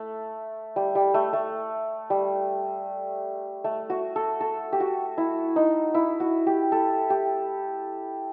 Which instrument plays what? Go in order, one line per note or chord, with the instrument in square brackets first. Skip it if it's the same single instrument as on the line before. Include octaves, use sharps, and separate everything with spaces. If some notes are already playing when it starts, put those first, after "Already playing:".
Already playing: [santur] A3
G3
G3
A3
A3
G3
A3
F#4
A4
A4
G4
F#4
E4
D#4
E4
F#4
G4
A4
G4